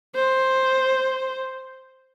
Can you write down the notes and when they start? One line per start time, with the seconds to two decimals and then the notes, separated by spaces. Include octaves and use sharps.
0.16 C5